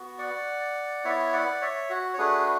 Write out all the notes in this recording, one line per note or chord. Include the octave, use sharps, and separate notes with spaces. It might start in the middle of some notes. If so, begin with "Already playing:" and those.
Already playing: B3 F#4
D5 F#5
B3 E4 C#5 E5
D5 F#5
C#5 E5
F#4
C#5
A3 D4 F#4 G#4 B4